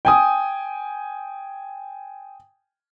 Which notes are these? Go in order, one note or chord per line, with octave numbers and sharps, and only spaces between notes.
G5 G#5 D#6